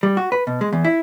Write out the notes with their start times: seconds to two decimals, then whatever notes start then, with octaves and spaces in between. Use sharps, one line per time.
0.03 G3
0.17 F#4
0.32 B4
0.47 B2
0.61 G#3
0.73 E2
0.85 E4